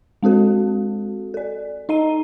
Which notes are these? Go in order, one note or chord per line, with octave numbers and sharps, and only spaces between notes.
G#3 C4 F#4 A4
A4 D5
D#4 D#5 A#5 D#7